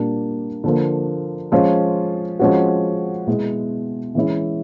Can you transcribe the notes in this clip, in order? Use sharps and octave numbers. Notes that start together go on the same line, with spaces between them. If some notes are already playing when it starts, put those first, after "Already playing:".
Already playing: A#2 G3 A#3 D4
D3 F3 A#3
F3 G#3 C#4 F4
F3 G#3 C#4 F#4
B2 G#3 B3 E4
E3 G#3 C#4 E4